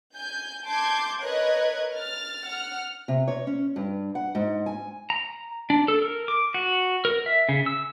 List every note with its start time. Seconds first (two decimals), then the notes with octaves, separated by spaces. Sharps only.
0.16 G#5 G6
0.66 A5 C6 D6 G6 G#6
1.21 A#4 B4 C#5 D#5 F#6 G#6
1.94 F6 A6
2.44 F#5 F6
3.08 C3
3.28 C#5
3.47 C#4
3.76 G2
4.15 F#5
4.35 G#2
4.66 G#5
5.10 A#5
5.70 D4
5.88 A4
6.02 A#4
6.28 D6
6.54 F#4
7.05 A#4
7.26 E5
7.49 C#3
7.66 E6